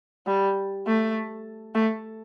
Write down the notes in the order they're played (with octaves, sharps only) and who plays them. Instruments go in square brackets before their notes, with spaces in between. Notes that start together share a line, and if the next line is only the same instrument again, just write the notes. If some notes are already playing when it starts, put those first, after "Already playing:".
[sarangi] G3
A3
A3